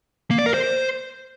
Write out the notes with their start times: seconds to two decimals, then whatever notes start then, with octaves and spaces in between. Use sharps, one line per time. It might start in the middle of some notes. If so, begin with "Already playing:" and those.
0.31 A#3
0.38 D5
0.46 A#4
0.54 C5